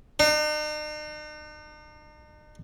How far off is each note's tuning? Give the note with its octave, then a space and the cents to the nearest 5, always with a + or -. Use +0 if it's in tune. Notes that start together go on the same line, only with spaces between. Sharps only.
D#4 -45